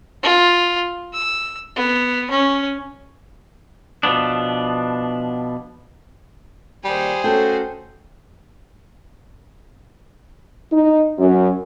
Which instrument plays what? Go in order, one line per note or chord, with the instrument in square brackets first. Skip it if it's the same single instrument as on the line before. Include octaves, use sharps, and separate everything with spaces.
[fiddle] F4
E6
B3
C#4
[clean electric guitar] B2 F3 B3 D4
[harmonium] A#2 D#3 [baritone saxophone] G3 [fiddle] G#4 C5
[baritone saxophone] A3 [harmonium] C#4 F#4 A4 [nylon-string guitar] G5
[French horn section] D#4
F#2